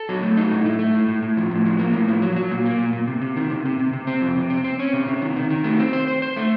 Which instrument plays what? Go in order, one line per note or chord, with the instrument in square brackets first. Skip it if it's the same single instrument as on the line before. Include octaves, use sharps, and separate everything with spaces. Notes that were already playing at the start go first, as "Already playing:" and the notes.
Already playing: [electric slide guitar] A4
F#3
A3
D#4
A2
A3
A3
A2
A2
A2
F3
A2
F3
A#3
A2
F3
F#3
F#3
A#2
A#3
A#2
A#2
C3
C3
D#3
C3
C3
C3
C3
C4
F2
C3
C4
C4
C#4
C3
C3
D#3
D#3
D#3
A3
C4
C5
C5
C5
A3